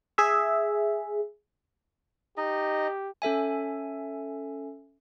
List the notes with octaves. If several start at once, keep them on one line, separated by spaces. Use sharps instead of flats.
G#4 E5
D#4 G4 D#5
C#4 A4 E5 G#5